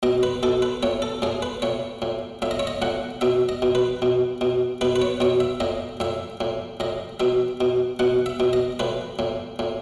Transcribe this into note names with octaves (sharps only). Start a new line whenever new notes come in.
B2 D#5
B4
B2 A4
B4
A2 C#5
A4
A2 G#4
B4
A2 C#5
A2
A2 E5
D#5
C#5
D#5
A2 F#5
B2 E5
D#5
B2
B4
B2
B2
B2 B4
B4
C#5
B2 C#5
E5
A2 D#5
A2 E5
A2
A2 D#5
B2 E5
B2
B2 F#5
E5
B2
D#5
A2 B4
A2
A2